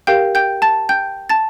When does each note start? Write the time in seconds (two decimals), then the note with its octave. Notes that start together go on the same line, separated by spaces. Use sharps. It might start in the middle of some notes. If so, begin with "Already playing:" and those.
0.07 G4 A#4 F5 G5 G6
0.35 G5 G6
0.62 A5 A6
0.89 G5 G6
1.29 A5 A6